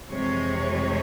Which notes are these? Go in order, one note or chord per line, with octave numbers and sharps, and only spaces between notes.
F2 C3 E3 G#3 C#5